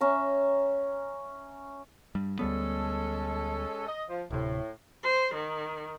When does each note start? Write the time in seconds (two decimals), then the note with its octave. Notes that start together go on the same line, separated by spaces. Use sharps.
0.01 C#4 E5 A#5
2.15 G2 G3
2.39 D2 G3 G#3 B3 C#4 A4
3.86 D#5
4.09 F3
4.31 D1 A2 C3
5.03 C5
5.35 D#3